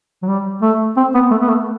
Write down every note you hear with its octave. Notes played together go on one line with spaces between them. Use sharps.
F#3
G3
A3
C4
B3
A3
B3
A3